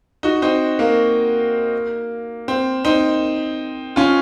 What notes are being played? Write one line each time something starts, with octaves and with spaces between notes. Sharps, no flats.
D#4 F#4
C4 D#4
A#3
C4
C4 D#4
C#4 F4